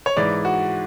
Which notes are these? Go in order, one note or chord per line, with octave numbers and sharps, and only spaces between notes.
C#5
G#2 E3 D5
F#4